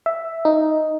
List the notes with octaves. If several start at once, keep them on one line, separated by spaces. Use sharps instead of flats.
E5
D#4